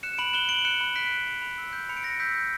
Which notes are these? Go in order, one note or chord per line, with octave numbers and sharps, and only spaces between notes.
F#6 C#7 E7
E7
B5 D7 F#7
F#6 E7 G7
B5 D7 F#7
F#6 C#7 E7
B5
F#6 B6 D7
B5
B5
B5
E6
G6
B5 C#7
D7
B5 A#6 C#7
E6 G6 B6
G6